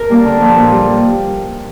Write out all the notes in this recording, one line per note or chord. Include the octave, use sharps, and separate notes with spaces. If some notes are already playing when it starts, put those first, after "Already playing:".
Already playing: A#4
G3 A#3 D4
D3
F3 A#3
A#2
G3